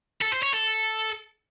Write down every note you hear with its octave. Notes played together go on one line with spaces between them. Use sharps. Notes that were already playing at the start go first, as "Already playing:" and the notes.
A4
C5
C#5
A4